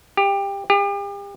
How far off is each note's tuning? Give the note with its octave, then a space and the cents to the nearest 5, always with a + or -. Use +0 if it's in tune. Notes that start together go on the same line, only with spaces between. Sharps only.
G4 +20
G4 +40